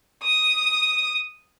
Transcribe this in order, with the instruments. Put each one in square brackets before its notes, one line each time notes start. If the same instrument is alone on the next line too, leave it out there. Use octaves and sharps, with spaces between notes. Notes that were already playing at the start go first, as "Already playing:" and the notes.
[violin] D#6